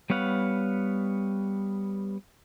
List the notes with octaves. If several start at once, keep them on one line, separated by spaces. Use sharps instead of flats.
G3 B3 C#5 F5 F#5